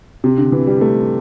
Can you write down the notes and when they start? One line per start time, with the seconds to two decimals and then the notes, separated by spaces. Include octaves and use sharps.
0.24 C3
0.38 D3
0.52 E3
0.67 G3
0.81 A3